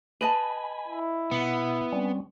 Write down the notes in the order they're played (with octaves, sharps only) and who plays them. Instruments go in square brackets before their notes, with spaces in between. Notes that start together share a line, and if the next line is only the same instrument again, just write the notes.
[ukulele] B4 D#5 A5 [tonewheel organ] G#5 B5
[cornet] E4
[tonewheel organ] B2 F#5 [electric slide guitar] B3
[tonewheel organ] G3 C4 C#4